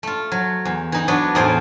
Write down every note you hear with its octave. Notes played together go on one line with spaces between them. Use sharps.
A3 F4
F#3
E2
E3 D#4
F#3 B3 D4 F#4 D#5
E2 A2 D#4 A#4 C5